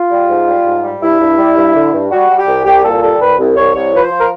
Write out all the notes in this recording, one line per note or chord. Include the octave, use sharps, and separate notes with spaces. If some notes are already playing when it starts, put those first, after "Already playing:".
Already playing: F4
G3
G#2
G3
G#2
G3
G2 E4
G2
G3
G2
D3
G2
G3 F#4
G3
G4
C2
C2 G4
A#2 A4
G3 A4
C2 B4
C2
C2 C#5
C2 C#5
F3 B4
C5
F3
A#4